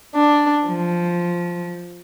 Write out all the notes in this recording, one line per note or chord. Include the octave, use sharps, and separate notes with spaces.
D4
F3